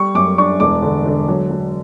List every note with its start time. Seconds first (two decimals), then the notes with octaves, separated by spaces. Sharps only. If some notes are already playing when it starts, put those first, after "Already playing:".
Already playing: G3 C#6
0.15 F#2 D6
0.38 D4 C#6
0.60 E1 D6
0.82 D3
1.06 D3
1.28 F#3
1.51 F#3